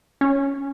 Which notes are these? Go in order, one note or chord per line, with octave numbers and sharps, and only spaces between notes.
C#4